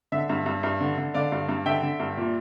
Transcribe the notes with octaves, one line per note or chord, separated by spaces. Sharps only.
D3 E5
G2
G2
G2
D3
D3
D3 D5 F5
G2
G2
D3 E5 G5
D3
G2
A#2